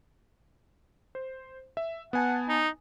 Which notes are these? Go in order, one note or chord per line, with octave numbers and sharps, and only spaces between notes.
C5
E5
B3 F#5 G#5 A5
D#4